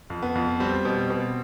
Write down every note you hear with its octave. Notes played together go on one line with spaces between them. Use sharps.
F2
B3
F2
G3 C4
B2
B2